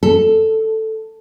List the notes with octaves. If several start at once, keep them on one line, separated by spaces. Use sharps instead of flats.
A4